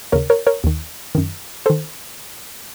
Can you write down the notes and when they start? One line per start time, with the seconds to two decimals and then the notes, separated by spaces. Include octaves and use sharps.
0.12 D#2 C#3 A#4 C#5
0.30 A#4 C#5
0.47 A#4 C#5
0.64 D#2 D#3
1.15 F#2 D#3
1.66 D#3 A4 C5